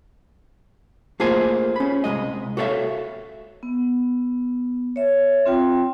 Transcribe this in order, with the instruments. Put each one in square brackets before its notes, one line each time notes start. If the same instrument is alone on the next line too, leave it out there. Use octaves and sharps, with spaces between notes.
[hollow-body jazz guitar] A3 A#3 F4 G#4 C5 G#5
C#4 B5
C2 F#2 G#3 D#5
F#4 A4 C#5 D5 E5 F5
[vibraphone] B3
C#5 E5
C4 F4 G5